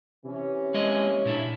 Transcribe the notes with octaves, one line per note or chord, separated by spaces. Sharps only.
C3 E3 C#4
G#3 A#3 D#5
A#2 D4 E4